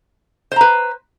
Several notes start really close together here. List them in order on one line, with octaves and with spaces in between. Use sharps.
C5 A#5 B4